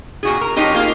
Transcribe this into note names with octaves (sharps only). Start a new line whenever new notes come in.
A#2 F#4 G#4
A#4
F3 G#3 C#4 D#4 G4
A#3 F4 G#4